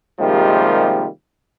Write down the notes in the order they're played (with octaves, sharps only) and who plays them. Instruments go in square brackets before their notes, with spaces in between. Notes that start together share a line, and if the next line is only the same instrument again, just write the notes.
[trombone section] C3 D#3 F3 G3 G#3 A#3